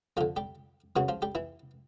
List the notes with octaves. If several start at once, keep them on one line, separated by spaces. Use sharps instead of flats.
F2 D3 F3 F4
G3 G4
D#2 C#3 E3 F#3 F#4
F3 F4
G3 G4
E3 E4